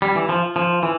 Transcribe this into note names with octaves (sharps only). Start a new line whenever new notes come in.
G3
E3
F3
F3
E3